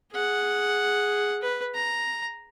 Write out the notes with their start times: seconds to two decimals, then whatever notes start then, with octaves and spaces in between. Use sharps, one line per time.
0.12 G#4 F#5
1.42 B4
1.74 A#5